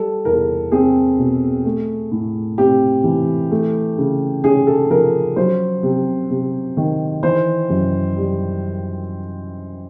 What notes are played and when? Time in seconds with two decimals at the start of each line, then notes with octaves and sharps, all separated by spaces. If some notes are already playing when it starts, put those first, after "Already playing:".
Already playing: G3 A4
0.25 E2 A#4
0.72 C4 G#4
1.19 B2
1.65 A3
2.12 A2
2.58 C4 G4
3.04 E3
3.51 A3
3.98 C#3
4.44 C#4 G#4
4.67 A4
4.90 F3 A#4
5.36 F#3 C5
5.83 C3
6.30 C3
6.77 D#3
7.23 E3 C5
7.70 F#2
8.17 G3